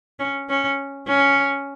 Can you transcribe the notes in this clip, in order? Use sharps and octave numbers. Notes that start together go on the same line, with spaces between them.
C#4
C#4
C#4